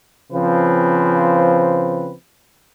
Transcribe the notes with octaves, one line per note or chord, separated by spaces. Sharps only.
C#3 F3 C4 B4